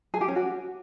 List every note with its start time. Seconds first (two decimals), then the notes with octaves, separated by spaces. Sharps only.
0.14 G#4
0.21 G4
0.28 C#4
0.36 F#4